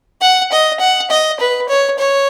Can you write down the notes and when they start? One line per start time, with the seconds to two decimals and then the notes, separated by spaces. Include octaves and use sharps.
0.22 F#5
0.52 D#5
0.80 F#5
1.11 D#5
1.40 B4
1.69 C#5
1.99 C#5